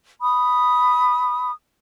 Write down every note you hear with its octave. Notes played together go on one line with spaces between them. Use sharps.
B5 D#6